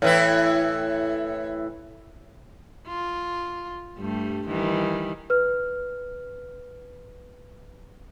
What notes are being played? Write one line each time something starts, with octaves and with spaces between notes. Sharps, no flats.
A2 E3 E4
F4
G2 G3 A3
D#3 E3 G3
B4 F6